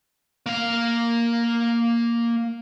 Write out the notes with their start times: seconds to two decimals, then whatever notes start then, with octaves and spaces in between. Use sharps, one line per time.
0.46 A#3 F5